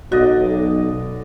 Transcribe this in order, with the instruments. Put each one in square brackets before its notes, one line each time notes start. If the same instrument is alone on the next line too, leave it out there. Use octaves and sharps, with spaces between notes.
[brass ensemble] B1 [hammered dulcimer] D3 D5 D#5 [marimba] F#4